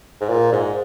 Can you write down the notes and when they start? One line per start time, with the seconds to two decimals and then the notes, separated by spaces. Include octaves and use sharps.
0.21 G#2
0.29 A#2
0.53 G#2